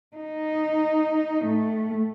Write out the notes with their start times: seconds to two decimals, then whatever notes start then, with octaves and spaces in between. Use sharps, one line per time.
0.16 D#4
1.43 A2 A3